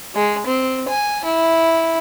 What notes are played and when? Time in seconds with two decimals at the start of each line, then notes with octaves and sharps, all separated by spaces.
0.15 G#3
0.46 C4
0.89 G#5
1.24 E4